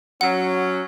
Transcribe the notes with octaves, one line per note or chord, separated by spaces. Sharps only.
F#3 C#4 F#5